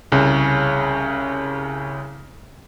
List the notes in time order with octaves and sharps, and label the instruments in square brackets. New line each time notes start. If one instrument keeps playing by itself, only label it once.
[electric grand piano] C2 C#3